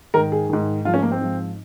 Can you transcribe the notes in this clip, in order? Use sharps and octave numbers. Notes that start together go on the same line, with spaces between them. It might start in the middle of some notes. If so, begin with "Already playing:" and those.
G#2 D#3 A#4
G#4
G#2 D#3
G#2 F3 F4
C#4
A#3
C4
G#2 F3